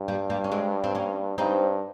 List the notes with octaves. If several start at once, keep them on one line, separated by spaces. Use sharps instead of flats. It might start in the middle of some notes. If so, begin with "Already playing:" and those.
Already playing: G2
G3 A#3
G3 A#3
C#4
G#3 C4
C4
A#3 C#4
G2 C4 D#4